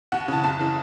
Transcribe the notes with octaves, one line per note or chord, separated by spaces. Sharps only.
D#2 F#5
C#3 E3 A5
F#1 A5
C#3 E3